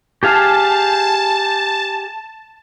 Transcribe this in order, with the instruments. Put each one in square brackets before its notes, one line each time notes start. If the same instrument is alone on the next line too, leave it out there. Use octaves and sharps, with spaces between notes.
[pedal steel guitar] G4 G#4 F5 [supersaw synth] A5